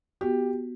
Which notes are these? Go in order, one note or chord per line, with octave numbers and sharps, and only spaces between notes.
B3 F#4 G4